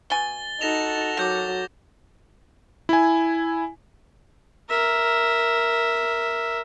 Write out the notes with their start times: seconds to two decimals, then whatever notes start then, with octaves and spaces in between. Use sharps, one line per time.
0.10 B2 G#5 A6 G7
0.61 D#4 F#4 A4 A#6 E7 F7
1.17 D#3 F#3 D6 G6 A#6
2.89 E4 G#5
4.69 A#4 E5